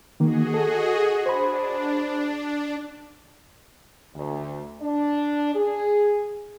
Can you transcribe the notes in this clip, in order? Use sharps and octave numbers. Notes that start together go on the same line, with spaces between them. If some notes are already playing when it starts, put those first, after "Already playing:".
D#3 A#3 F#4 G#4 D#5
A4
D4 C5 B5
D2
D4
G#4